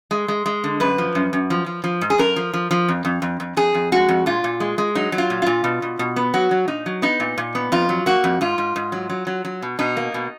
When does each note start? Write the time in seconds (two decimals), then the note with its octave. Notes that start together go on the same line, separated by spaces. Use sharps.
0.11 G#3
0.28 G#3
0.46 G#3
0.64 D3
0.80 F#2 B4
0.98 F3
1.15 F#2
1.33 F#2
1.50 F3
1.66 F3
1.84 F3
2.01 G#2
2.10 G#4
2.18 F#2 A#4
2.36 F3
2.53 F3
2.71 F3
2.88 F2
3.05 F2
3.22 F2
3.40 F2
3.57 F2 G#4
3.74 F2
3.92 G#3 F#4
4.08 F2
4.26 A#2 F4
4.44 A#2
4.60 G#3
4.78 G#3
4.95 F#3 D#4
5.12 F#3
5.18 F4
5.30 A#2
5.42 A#2 F4
5.64 B2
5.82 B2
5.99 B2
6.16 B3
6.34 F#3 F#4
6.51 F#3
6.68 A#2 D#4
6.86 F#3
7.02 B3 D#4
7.20 A#2
7.38 A#2
7.55 B3
7.72 F2 F4
7.89 F#3
8.06 A#3 F#4
8.24 F2
8.41 G#2 F4
8.58 G#2
8.76 G#2
8.92 F#3
9.10 F#3
9.27 F#3
9.45 F#3
9.62 B2
9.79 B2 D#4
9.97 A#3
10.14 B2